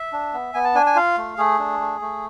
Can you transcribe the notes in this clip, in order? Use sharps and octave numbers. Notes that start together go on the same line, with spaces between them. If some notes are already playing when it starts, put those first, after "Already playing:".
Already playing: E5
D4
B3
B3 G#5
A5
D4 G#5
G#5
F4 F5
A3
A3 G#4
D4
A3
A3